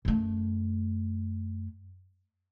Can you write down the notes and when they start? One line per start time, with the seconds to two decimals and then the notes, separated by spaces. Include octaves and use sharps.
0.05 F#2 A3